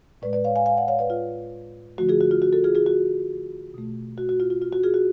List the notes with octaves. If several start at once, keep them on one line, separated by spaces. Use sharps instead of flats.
A2 G#3 B4 D5
B4 D5
C#5 F5
F5 G#5
F5 G#5
D5 F#5
C#5 F5
B4 D5
F4
D3 F3 A3 F#4
F4 G#4
F#4
F4
F#4
F#4 A4
F4 G#4
F4 G#4
F#4
B2 A3
F#4
F#4
F4
F4
F4
F#4
F4 G#4
F#4